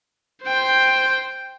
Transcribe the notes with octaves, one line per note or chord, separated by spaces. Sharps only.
C5 G5